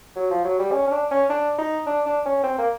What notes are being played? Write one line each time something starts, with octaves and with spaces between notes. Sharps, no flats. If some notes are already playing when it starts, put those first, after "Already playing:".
F#3
F3
F#3
G3
C#4
C#4
D4
C#4
D4
D#4
D4
D4
C#4
C4
A#3